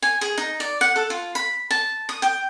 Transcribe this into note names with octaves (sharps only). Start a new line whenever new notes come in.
G#5
G#4
D#4
D5
F#5
A4
F4
B5
A5
D#6
G5